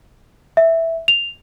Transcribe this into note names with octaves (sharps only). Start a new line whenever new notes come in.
E5
F7